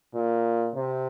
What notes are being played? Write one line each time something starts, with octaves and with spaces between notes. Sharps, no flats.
A#2
C3